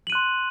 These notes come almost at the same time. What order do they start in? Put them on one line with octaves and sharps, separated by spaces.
F#7 D#7 F#6 C6